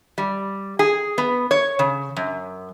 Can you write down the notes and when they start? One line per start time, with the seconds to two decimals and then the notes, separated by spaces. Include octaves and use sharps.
0.18 G3
0.79 G#4
1.18 B3
1.51 C#5
1.79 C#3
2.16 F#2